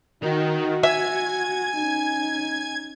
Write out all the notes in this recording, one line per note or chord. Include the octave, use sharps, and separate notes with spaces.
D#3 F#4 A#4 D#5
E5 G#5 G#6
C#4 D#4